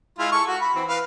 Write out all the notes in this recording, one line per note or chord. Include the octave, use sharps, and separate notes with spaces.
G#3 E4 F4
A4 C#6
F#4
B5
E3 C4
B4 F5